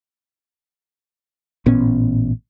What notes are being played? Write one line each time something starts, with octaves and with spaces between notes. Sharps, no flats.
A1 A#2 B3 C#4